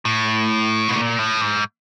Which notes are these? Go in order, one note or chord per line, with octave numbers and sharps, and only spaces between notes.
A2
B2
A#2
A2
G#2